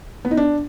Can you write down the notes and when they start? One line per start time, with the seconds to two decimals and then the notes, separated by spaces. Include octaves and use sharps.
0.25 B3
0.31 D#4
0.37 D4